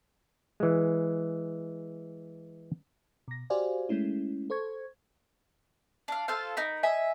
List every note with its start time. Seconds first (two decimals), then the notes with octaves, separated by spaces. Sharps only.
0.60 E3 G#3
3.28 B2 A#6
3.50 F#4 G4 C5 D5 F5 G#5
3.89 G#3 A3 C#4 E4
4.50 A4 C5 C#6 G#6
6.08 D4 F5
6.28 F4 A4 C5 F5
6.57 D#4 A#4 B5
6.83 D#5 E5 G#5